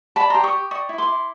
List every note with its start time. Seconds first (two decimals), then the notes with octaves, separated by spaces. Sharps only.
0.16 D5 A5 B5
0.30 G4 A#5 C6
0.44 C#6 D#6
0.53 G4
0.71 D5 C#6 D#6
0.89 E4
0.98 C6 D6
1.08 E4